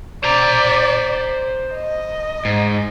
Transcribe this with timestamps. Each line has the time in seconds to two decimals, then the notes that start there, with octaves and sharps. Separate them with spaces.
0.24 C5 D5 A#5
1.74 D#5
2.45 G#2